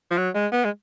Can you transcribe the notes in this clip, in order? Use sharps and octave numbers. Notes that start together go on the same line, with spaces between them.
F3
F#3
G#3
B3
G#3